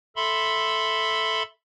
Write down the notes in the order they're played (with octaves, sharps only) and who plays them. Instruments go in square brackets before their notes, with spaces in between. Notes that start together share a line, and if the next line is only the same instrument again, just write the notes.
[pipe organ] A4 E5 B5 C6